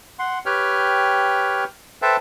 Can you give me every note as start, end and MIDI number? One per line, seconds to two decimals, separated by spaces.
0.19 0.39 78
0.19 0.39 84
0.46 1.64 67
0.46 1.64 71
0.46 1.64 73
0.46 1.64 79
0.46 1.64 89
2.02 2.17 69
2.02 2.17 71
2.02 2.17 72
2.02 2.17 76
2.02 2.17 79
2.02 2.17 81